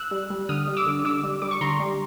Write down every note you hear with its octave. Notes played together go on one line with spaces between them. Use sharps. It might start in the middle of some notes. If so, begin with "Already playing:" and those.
Already playing: E6 F#6
G3
G3
D3 D#6 F6
G3
D6 E6
D3
D3 D6 E6
G3
G3 D6
C#6
D3 A#5 C6
G3